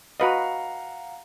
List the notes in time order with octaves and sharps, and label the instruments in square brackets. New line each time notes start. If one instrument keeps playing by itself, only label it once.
[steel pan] F#4 B4 D#5 [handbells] F5 F#5 A#5